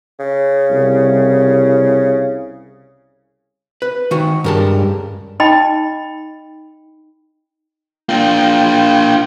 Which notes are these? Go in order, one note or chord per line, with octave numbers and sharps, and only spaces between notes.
C#3
C2
B4
D#3 F#4
C#2 G2 A#4 A5
D#4 D#5 G5 B5
A#3 D4 F4 G5